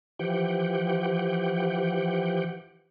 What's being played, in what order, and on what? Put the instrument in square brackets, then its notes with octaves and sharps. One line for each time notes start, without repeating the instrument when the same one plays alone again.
[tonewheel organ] E3 F3 G4 F#5 G5